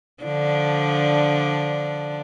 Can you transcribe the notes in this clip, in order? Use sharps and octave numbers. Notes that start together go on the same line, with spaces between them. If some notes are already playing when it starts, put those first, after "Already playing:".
D3 F3 D4